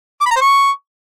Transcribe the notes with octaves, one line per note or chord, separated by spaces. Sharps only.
D6
B5
A#5
C5
C#6